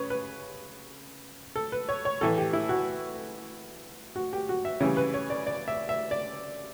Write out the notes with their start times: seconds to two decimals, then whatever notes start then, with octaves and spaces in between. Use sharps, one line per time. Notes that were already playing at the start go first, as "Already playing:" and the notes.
Already playing: C#3 B4 C#5
0.10 B4
1.56 A4
1.72 B4
1.89 C#5
2.05 C#5
2.21 A2 E3 A3 A4
2.38 G4
2.53 E4
2.69 F#4
4.16 F#4
4.33 G4
4.49 F#4
4.65 E5
4.80 C#3 E3 G3 C#5
4.97 B4
5.14 C#5
5.30 D5
5.47 D5
5.68 E5
5.89 E5
6.11 D5